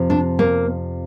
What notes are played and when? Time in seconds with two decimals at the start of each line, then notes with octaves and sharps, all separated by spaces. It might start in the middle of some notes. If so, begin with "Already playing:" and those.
Already playing: F2 C3 F3
0.10 D4
0.39 A#3